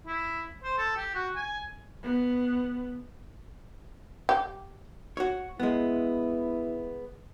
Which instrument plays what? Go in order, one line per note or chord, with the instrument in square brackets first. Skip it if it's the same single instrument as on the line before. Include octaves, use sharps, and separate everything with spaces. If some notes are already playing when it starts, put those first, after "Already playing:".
[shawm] E4
C5
A4
G4
F#4
G#5
[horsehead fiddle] B3
[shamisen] G4
[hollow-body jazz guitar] F#4 C#5
[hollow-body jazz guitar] G#3 B3 [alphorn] E4